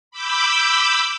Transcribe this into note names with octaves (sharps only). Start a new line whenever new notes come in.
B5 D6 E6 G6